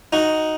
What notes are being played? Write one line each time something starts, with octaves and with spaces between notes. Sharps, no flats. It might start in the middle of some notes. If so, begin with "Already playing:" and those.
D#4 F#4